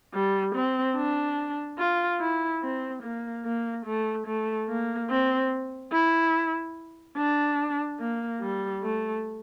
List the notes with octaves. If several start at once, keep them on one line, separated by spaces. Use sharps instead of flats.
G3
C4
D4
F4
E4
C4
A#3
A#3
A3
A3
A#3
C4
E4
D4
A#3
G3
A3